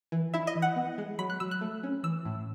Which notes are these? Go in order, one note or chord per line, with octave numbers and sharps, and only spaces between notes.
E3
E4 E5
D#5
E3
F#5
B3
G#3
F#3 B5
F#6
F#3 E6
F#6
A3
C#4
E3 E6
A2